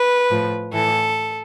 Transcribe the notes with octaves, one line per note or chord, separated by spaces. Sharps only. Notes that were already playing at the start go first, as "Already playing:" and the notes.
Already playing: B4
A2 F3
A2 E3 A4